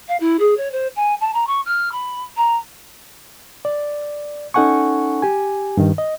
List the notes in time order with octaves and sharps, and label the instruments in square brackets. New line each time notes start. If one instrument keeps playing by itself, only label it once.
[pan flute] F5
E4
G#4
C#5
C5
G#5
A5
A#5
C#6
F6
B5
A#5
[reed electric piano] D5
C#4 D#4 A4 F#5 G#5 C#6
G4 G#5
G2 D#3
D#5